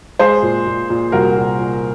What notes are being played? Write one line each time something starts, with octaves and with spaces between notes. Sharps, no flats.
G#3 G#4 C5
A#2
A#2
A#2
C2 F#4 A#4
A#2
A#2